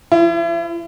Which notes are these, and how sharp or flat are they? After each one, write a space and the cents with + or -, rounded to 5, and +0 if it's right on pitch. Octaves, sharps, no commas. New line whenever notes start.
F3 -25 E4 +35